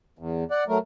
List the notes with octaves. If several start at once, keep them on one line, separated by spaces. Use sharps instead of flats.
E2
D5 F#5
F#3 A3 A#4